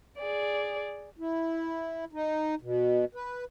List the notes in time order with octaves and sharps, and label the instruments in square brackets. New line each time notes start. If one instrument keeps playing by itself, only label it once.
[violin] G#4 D5
[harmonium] E4
D#4
B2
B4